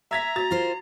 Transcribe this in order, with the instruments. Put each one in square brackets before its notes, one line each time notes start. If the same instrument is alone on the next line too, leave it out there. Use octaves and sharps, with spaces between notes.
[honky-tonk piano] E5 G#6 B6 [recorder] A#5
[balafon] F#4 [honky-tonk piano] A6
[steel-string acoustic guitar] F4 A#4 C5